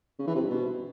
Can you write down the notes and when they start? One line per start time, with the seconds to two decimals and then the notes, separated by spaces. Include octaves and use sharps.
0.19 C#3
0.27 E3
0.35 C3
0.43 G2
0.50 B2